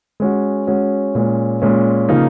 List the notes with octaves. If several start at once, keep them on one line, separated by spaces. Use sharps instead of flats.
G#3 C#4 F#4
G#3 C#4 F#4
A#2 G#3 C#4
A#2 G#3 C#4
C#3 F3 A#3 D#4